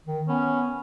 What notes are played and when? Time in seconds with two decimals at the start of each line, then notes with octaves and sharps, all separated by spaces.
0.06 D#3
0.28 B3 C#4